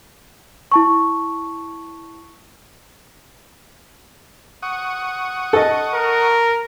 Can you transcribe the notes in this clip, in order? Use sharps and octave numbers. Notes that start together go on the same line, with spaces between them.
E4 A5 C#6
F#5 C#6 D#6
A4 D#5
A#4